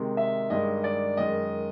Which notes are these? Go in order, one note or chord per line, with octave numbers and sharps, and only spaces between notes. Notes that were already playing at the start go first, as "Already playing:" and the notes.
Already playing: C3 D#3 G#3
E5
G2 D#3 G#3 D#5
D5
F#2 D#3 G#3 D#5